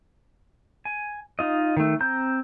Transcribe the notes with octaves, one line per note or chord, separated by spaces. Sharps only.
G#5
D#4 F4 D#5
D#3 A3
C4 A#5 G6